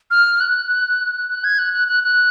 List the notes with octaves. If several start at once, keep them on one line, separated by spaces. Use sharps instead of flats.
F6
F#6
F#6
G#6
F#6
F#6
F#6
F#6